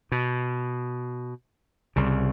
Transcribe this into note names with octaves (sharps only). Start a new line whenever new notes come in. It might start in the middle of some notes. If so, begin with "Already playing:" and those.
B2
C2 C#3